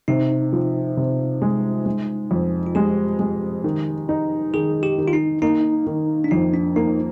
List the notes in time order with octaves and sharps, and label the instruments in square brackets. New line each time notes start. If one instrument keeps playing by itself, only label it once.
[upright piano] C3 [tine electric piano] D#4
[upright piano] F3
C3
G#3
G#3
F2
[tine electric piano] F4
[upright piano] G#3 [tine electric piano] G4
[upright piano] G#3
D#3
D#4
[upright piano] D#3 [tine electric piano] G#4
[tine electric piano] G4
[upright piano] D#3
[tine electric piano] F4
D#4
[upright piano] A#3 [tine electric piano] D#4
[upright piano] D#3
[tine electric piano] D4
[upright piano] F2 [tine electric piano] D#4
[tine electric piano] D4
[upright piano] A#3 [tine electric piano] D#4